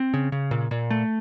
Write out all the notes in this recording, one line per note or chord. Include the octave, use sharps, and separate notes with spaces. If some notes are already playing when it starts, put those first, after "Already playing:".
Already playing: C4
C#3
C#3
A#2
A#2
A3